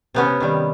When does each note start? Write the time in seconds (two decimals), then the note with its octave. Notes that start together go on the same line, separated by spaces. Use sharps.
0.14 C3 B3 C#4
0.40 D#3 G3